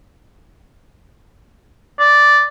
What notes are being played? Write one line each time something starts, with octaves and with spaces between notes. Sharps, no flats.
D5